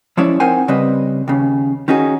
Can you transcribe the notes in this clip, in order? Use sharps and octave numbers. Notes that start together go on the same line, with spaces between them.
F3 G#3 C#4 E4 C#5 D5
C4 D#4 A#4 C5 F#5 G#5
C#3 G3 C4 B4 D#5
D#2 C#3
D#3 C#4 D#4 F#4 G#4